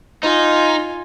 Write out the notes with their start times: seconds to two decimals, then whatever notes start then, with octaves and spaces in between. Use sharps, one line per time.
0.23 D#4 F4 G#5